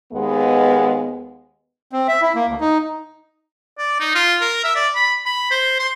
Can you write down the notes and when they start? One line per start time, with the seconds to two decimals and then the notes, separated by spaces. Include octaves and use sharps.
0.13 D#2 G#3 B3
1.93 C4
2.08 E5
2.22 E4
2.35 A#3
2.47 D2
2.61 D#4
3.78 D5
4.00 D#4
4.15 F4
4.41 A#4
4.64 E5
4.75 D5
4.95 B5
5.25 B5
5.51 C5
5.79 C6